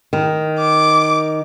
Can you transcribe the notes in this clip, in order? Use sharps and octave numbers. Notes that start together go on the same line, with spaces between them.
D#3
D6